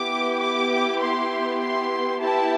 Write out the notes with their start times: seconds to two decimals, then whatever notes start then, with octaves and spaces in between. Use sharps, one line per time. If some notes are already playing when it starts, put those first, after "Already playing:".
Already playing: B3 E4 G4 D6
0.39 D6
0.99 C6
1.60 C6
2.21 B3 E4 G4 A5